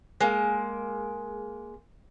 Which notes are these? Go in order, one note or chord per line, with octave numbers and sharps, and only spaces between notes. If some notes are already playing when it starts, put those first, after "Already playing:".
G#3 A#3